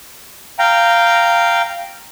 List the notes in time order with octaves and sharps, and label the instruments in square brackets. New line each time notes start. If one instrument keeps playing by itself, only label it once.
[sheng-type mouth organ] F5 G5 A#5